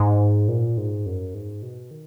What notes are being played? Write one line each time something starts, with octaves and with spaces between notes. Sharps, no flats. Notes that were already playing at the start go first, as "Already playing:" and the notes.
Already playing: G#2
A#2
G#2
F#2
G#2
B2
D#3